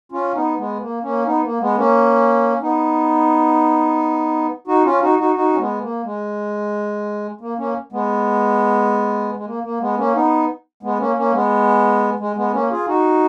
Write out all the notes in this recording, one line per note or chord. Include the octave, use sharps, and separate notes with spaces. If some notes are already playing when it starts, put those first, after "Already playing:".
C#4 F4
B3 D#4
G#3 B3
A#3
A#3 C#4
B3 D#4
A#3
G#3 B3
A#3 C#4
B3 D#4
D#4 F#4
C#4 F4
D#4 F#4
D#4 F#4
D#4 F#4
C#4
G#3 B3
A#3
G#3
A#3
A#3 C#4
G#3 B3
G#3
A#3
A#3
G#3 B3
A#3 C#4
B3 D#4
G#3 B3
A#3 C#4
A#3 C#4
G#3 B3
G#3
G#3 B3
A#3 C#4
F4 G#4
D#4 F#4